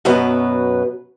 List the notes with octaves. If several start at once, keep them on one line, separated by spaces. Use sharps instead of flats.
F#2 B2 F#3 B3